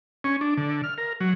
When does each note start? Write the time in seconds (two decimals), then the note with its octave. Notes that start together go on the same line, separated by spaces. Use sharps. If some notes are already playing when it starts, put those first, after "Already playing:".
0.24 C#4
0.41 D4
0.57 D3
0.84 F6
0.98 A#4
1.20 F#3